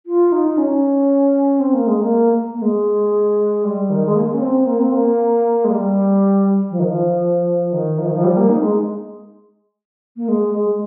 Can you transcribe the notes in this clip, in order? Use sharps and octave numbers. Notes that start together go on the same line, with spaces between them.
F4
D#4
C#4
C4
A#3
G#3
A#3
A#3
G#3
G3
D#3
G#3
A#3
C#4
C4
A#3
C4
A#3
G#3
G3
F3
D#3
F3
D#3
F3
D#3
F3
G3
A#3
D#4
G#3
A#3
G#3
G#3